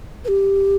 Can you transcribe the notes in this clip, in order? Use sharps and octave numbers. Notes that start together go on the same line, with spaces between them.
B4
G4